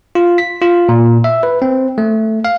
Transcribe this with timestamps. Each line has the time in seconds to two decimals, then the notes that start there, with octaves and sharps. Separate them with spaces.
0.15 F4
0.38 B6
0.62 F4
0.89 A#2
1.24 E5
1.43 B4
1.62 C4
1.98 A3
2.45 F5